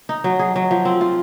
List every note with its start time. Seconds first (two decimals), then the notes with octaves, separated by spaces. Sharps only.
0.09 D#4
0.24 F#3
0.39 G#4
0.56 F#3
0.71 F3
0.85 C4
1.01 F4